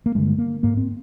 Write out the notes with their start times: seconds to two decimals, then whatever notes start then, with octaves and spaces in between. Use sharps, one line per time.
0.06 A#3
0.15 G2 D3 G#3
0.38 A#3
0.63 G#2 A#3
0.77 C4